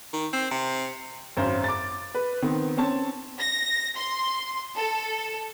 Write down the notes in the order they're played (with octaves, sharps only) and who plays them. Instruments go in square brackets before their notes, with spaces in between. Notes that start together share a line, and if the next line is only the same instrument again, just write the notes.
[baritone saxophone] D#3
C4
C3
[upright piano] G#1 F#2 C5
D6 A6
B4
D#3 B3 C4
C4 C#4 C#5 A5
[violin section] A#6
C6
A4